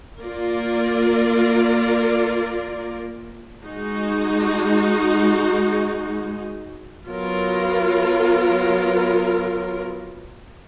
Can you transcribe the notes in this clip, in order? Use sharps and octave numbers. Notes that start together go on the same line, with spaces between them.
A#3 F4 A#4 D5
G#3 D#4 F#4
F#3 B3 F4 A#4